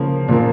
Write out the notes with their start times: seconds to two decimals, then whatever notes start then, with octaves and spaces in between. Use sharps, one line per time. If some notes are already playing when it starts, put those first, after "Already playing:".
Already playing: C#3 F3 A#3
0.28 A#2 F3 A#3